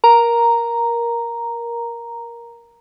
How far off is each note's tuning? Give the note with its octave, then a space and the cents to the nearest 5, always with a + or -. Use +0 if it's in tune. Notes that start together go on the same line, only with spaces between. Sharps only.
A#4 +15 A#5 +0